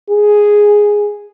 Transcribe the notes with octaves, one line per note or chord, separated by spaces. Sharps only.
G#4